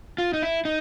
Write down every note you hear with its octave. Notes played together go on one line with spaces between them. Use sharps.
F4
D#4
E4
D#4